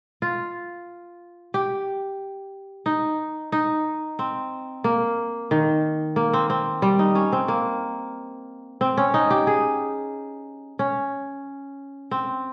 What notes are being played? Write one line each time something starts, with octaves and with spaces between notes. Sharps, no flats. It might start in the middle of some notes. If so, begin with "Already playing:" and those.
F4
G4
D#4
D#4
C4
A#3
D#3
A#3
C4
C4
G3
D#4
C#4
C4
A#3
C4
C#4
D#4
G4
G#4
C#4
C4